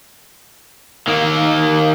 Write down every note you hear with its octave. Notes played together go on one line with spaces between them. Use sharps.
D#3 A#3